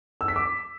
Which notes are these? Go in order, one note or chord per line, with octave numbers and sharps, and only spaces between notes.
E6
B6
D6